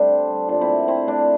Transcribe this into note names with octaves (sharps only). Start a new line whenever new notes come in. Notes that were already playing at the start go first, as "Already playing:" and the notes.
Already playing: G3 A3 C4 D4
D3
G3
A#2 D4 F4
C4 E4
A3
D3 C4 E4
A3 D4